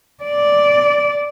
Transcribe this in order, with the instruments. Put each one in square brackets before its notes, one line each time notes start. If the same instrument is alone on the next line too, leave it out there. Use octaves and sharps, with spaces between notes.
[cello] D5